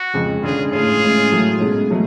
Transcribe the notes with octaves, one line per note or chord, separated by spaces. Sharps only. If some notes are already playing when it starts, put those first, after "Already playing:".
Already playing: F#4
F2 C#3 G#3
D3 G#3 C#4 F4 G#4
A2 G#3 C#4 F4 G#4
A2 G#3 C#4
A2 F#3 A3
B2 G#3 C#4
B2 F#3 A3